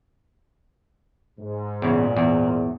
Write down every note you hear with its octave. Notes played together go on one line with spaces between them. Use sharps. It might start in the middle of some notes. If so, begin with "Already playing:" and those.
G#2
E2 A#2 C#3
E2